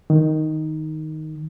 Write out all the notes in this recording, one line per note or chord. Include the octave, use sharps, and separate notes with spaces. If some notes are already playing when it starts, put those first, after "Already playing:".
D#3